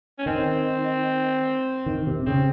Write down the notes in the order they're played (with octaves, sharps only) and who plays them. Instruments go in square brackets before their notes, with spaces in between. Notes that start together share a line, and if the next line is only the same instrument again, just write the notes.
[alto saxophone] C#4
[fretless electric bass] D#3 [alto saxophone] C4
[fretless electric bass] D#3
C3
[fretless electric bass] C#3 [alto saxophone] C4